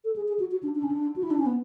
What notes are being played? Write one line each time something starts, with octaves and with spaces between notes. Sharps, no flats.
A4
G#4
G#4
F#4
F#4
D4
D4
C#4
D4
F#4
E4
D4
C#4
B3